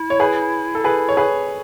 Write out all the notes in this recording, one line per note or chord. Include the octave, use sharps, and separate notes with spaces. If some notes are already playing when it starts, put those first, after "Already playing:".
Already playing: E4
C#5
G#4 B4
A4
G#4 B4
C#5
G#4 B4